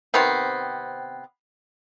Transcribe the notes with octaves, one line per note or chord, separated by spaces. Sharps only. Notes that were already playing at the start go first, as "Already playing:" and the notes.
C3 D#3 B3 C4